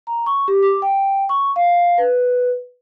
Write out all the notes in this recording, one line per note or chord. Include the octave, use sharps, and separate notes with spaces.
A#5
C#6
G4
D6
G5
C#6
F5
B4